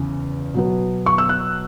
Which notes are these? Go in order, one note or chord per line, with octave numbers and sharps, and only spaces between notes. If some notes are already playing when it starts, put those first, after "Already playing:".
Already playing: E2 C#3
B2 F#3 B3
C#6
E6
F#6